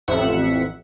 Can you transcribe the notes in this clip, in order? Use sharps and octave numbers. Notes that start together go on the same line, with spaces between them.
A1 F2 E5 F#5